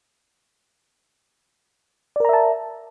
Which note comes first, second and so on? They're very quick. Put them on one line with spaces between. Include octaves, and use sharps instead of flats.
D5 A#4 A#5 E5 A5